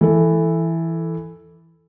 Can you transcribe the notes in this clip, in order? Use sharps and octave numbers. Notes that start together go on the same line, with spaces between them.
E3 A4